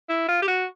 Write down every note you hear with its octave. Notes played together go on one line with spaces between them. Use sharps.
E4
F4
G4
F#4